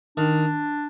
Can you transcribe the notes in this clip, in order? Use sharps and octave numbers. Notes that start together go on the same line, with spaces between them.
D#3 D4